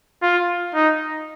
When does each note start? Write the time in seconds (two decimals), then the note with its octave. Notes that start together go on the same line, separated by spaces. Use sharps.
0.22 F4
0.74 D#4